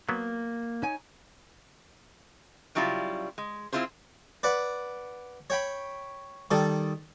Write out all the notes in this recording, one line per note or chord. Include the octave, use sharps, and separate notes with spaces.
F#3 A#3 B3
D#4 C#5 G#5
C#3 F#3 G3 E4 F4
G#3
C4 E4 F4 G#4 C5
B4 D5 F#5
C#5 G5 B5
D#3 G3 A4